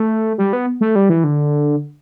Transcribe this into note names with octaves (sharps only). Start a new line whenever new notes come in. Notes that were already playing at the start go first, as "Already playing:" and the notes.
Already playing: A3
G3
B3
A3
G3
E3
D3